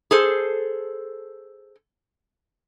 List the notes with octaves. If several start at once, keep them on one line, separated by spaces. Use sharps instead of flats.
G#4 A4 C5